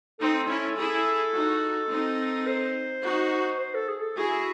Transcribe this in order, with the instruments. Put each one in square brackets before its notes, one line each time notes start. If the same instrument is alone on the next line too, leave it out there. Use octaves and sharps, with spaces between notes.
[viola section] C4 D#4 [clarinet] A4
[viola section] C#4 E4
E4 G#4
D#4 F#4
C4 D#4
[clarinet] C5
[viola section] D#4 F#4
[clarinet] C5
A4
G#4
A4
[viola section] E4 G#4 [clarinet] F#4